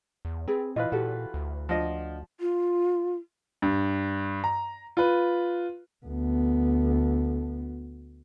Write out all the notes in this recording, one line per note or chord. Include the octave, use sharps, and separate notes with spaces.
E2
C4 G#4 B4
A#2 E3 F4 B4 D#5
A#2 F#4 G4 A4
D2
F3 D4 D#5 F#5
F4
G2
A#5
F4 B4
D2 B3